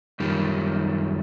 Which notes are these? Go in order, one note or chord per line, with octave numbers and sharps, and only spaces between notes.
F#2 D#3 G3